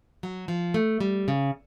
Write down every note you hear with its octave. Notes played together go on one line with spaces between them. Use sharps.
F#3
F3
A3
G3
C#3